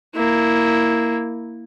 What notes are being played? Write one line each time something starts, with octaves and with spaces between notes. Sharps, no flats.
A#3 E4